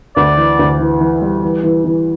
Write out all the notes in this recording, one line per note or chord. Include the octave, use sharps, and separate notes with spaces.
D2 D5
E3
D2
E3
E3
G3
E3
E3
E3